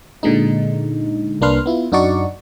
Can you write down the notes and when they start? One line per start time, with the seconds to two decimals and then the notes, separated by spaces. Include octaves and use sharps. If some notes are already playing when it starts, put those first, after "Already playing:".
0.23 A#2 D3 G#3 D#4
1.41 C2 A#3 D4 B4 C6 F6
1.66 B3 E4 F4
1.92 F#2 D4 D#4 F#4 D5 C#6